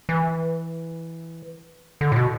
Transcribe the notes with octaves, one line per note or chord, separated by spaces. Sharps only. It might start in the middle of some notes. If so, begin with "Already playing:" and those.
E3
D3
A2
B2